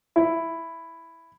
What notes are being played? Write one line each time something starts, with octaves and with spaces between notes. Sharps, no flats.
E4